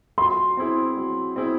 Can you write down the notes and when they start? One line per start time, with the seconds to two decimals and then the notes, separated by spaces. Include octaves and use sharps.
0.18 F#3 C6
0.57 C4 E4 G#4
0.97 F#3
1.36 C4 E4 G#4